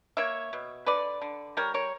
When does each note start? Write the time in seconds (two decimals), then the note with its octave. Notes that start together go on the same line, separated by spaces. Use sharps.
0.17 A#3 C#5 E5
0.53 B2
0.86 D3 B4 D5
1.21 D3
1.57 G3 A#4 C#5
1.74 A#4 C#5